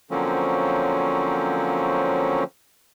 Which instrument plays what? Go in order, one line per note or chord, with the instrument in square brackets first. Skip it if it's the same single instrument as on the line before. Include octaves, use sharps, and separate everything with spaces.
[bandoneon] D3 F3 F#3 A#3 C4 C#4